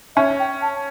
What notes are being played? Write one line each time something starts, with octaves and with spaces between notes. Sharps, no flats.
C#4 E5
G5
A5